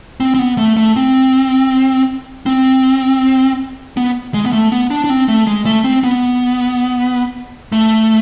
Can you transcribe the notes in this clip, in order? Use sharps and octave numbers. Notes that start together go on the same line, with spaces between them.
C4
C4
B3
A3
A3
C4
C4
B3
G#3
B3
A3
B3
D4
D4
C4
A3
G#3
A3
C4
B3
A3